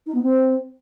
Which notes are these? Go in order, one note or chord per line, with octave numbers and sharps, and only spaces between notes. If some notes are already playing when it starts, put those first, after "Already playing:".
D#4
B3
C4